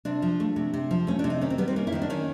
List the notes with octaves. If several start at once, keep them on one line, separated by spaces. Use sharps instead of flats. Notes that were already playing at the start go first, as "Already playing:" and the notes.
C3 D4
F3
A3
C3
C3
F3
A3 C#4
C3 D4
D#4
D#3 C#4
C4
G3 B3
C4
A#3 C#4
E4
D#3 D#4
D4
D#3 C#4